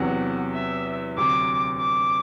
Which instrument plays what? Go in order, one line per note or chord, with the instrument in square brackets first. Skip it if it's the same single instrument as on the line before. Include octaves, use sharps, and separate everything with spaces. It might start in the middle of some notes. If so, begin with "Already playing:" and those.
Already playing: [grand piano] E2 C3 F#3 [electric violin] F#5
[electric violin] E5
[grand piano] D2 C3 F#3 [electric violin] D6
[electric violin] D6